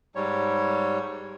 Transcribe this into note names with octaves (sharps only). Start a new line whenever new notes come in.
G#2 G3 C#5